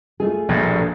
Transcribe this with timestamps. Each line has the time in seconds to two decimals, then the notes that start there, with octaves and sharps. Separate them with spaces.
0.20 A3 F4 G#4
0.49 A#1 G2 B2